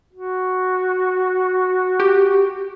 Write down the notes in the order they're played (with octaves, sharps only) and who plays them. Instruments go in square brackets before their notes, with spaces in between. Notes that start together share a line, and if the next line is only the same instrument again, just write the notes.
[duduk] F#4
[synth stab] G4